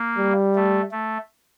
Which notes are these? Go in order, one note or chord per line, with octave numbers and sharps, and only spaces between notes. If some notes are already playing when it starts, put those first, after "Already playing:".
Already playing: A#3
G3
A3
A3